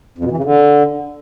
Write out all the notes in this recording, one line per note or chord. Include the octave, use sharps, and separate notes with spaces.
F2
B2
E3
C#3
D3